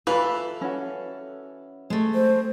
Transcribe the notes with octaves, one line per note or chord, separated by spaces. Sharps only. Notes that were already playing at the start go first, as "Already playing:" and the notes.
E3 F4 A4 B4 F5 B5
C#4 F#4
G#3 A3
C5